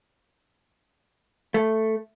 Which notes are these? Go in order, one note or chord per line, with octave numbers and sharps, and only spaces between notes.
A3